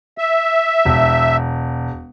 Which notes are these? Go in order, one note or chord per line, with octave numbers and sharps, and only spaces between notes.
E5
E1